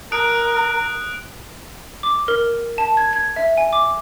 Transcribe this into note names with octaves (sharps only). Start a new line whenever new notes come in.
A#4 D#6 F#6 D7
D6
A#4
A5
G#6
G#6
E5
G#5
D6